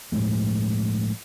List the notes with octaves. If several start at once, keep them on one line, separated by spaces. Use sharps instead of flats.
A2 F3 G#3 A3